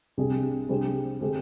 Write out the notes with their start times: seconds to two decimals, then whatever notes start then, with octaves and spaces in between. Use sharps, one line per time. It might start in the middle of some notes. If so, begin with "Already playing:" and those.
0.17 C2 C3 G3 D4 G#4
0.69 C3 G3 D4 G#4 C5
1.21 D3 G#3 C4 G4